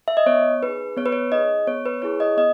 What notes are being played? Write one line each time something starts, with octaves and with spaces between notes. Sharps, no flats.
E5
D#5
B3 C#5
D#4 G#4 B4
B3 C#5
B4
C#5
D#4 G#4 D#5
B3 C#5
B4
E4 G#4 C#5
D#5
B3 D#5